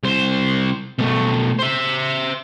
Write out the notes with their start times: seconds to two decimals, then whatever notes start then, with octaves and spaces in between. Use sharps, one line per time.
0.03 C2 C5
0.99 B2 A3
1.59 C5 E5